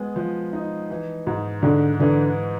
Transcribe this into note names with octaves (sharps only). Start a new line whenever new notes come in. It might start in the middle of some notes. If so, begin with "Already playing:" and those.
Already playing: G#3 B3
F3
D#4
E3
G#2
G#2 D3
D3 E3